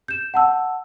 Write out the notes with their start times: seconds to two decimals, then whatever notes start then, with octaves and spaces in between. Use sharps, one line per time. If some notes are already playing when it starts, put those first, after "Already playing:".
0.08 G6 E7
0.34 F#5 A5 E6